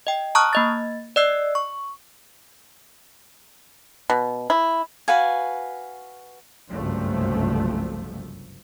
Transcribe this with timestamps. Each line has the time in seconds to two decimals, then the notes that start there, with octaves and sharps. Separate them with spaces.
0.07 D#5 G5
0.35 A5 A#5 C#6 D#6 F6 F#6
0.53 A#3 D#5 A6
1.16 D5 D#5 E6 F#6 C7
1.55 C#6
4.10 B2
4.50 E4
5.08 F#4 B4 F5 G#5
6.71 F#1 C2 G2 F3 A3